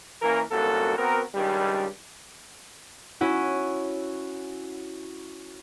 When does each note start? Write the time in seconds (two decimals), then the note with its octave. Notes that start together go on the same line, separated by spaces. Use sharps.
0.22 E3 A#3 C#4 A#4
0.51 C2 F#2 A#2 A#3 F#4 A4
0.97 B3 C4 F#4 A#4
1.35 C#2 G2 D#3 G3
3.21 C#4 E4 F#4